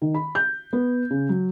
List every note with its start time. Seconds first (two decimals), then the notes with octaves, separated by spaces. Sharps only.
0.02 D#3
0.14 B5
0.35 G6
0.73 B3
1.11 C#3
1.29 F#3